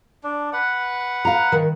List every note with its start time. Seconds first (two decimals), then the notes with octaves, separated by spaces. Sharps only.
0.24 D4
0.53 B4 F#5
1.25 F5 A#5
1.52 D#3